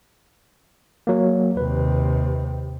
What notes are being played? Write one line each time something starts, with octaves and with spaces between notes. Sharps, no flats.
F#3 A#3
D#2 C3 B4